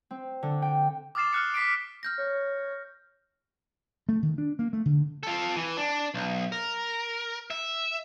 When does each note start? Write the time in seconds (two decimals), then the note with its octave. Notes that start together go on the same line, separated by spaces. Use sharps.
0.11 C4
0.43 D3
0.62 G5
1.15 D6 D#6 F6 A6 C7 E7
1.33 F6 F#6 C#7
1.54 D6 B6 C7 D7
2.03 F6 G6 A#6
2.18 C#5
4.09 A3
4.23 D#3
4.38 D4
4.59 A#3
4.73 A3
4.86 D3
5.23 F4 A4
5.56 E3
5.77 D4
6.14 B1
6.52 A#4
7.50 E5